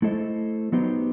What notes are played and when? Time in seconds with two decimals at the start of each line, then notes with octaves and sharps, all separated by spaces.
0.02 A3 E4 A4 C5 D#5
0.72 F#3 B3 D#4 G4 C5